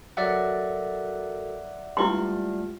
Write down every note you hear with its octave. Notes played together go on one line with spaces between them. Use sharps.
F#3 F#4 A4 A#4 D5 E5 F#5
G2 G#3 A3 E4 F4 C6